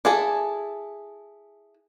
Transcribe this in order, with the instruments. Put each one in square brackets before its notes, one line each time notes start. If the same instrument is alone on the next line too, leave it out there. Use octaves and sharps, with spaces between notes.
[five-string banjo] E4 G#4 A4